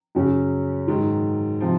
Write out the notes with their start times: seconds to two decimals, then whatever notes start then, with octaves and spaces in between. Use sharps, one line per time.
0.15 F#2 C#3 F#3 C#4
0.88 G#2 D#3 F#3
1.61 C3 F3